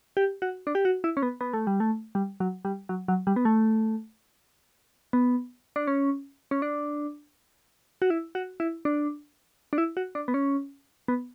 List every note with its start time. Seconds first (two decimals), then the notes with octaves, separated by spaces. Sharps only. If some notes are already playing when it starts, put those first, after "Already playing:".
0.17 G4
0.42 F#4
0.67 D4
0.75 G4
0.85 F#4
1.04 E4
1.17 C#4
1.23 B3
1.41 B3
1.53 A3
1.67 G3
1.80 A3
2.15 G3
2.40 F#3
2.65 G3
2.89 F#3
3.08 F#3
3.27 G3
3.36 B3
3.45 A3
5.13 B3
5.76 D4
5.87 C#4
6.51 C#4
6.62 D4
8.02 F#4
8.10 E4
8.35 F#4
8.60 E4
8.85 D4
9.73 D4
9.78 E4
9.97 F#4
10.15 D4
10.28 B3
10.34 C#4
11.08 B3